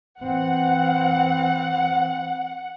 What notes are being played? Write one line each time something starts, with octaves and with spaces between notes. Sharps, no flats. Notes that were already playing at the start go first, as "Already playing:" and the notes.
E3 C4 F#5